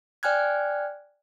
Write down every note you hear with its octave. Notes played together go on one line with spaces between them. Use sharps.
D5 G5 G#5 F6 F#6 G#6